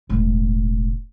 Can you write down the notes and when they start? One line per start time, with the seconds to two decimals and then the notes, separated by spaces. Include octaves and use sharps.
0.09 E1 A2